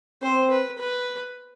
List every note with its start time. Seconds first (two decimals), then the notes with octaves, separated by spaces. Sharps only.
0.22 C4 C5
0.50 B4
0.78 B4